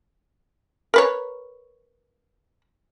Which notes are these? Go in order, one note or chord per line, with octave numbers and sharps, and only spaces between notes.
A#4 B4 C#5